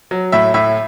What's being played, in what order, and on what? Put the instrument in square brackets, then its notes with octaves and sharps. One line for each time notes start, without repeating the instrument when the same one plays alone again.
[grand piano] F#3
A2 E5
A2 E5